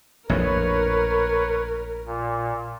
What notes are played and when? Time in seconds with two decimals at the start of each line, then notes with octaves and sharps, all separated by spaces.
0.29 A#1 F2 A2 A#4 B4 C#5
2.06 A#2